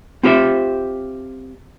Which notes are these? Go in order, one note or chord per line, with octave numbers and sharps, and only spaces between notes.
C4 F4 G4 C5 E5